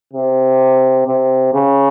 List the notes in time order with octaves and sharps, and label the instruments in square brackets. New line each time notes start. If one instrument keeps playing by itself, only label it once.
[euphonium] C3
C3
C#3